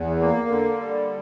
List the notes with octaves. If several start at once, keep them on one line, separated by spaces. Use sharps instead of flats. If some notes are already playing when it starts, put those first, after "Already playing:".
Already playing: E2
A#3
D3
G3